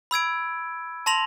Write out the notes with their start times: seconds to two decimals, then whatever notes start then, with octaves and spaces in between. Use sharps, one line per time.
0.11 B5 E6 G#6 D7
1.06 A5 C6 A#6 F7 F#7